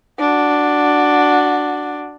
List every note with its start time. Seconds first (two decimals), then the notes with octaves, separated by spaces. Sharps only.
0.19 D4 F#4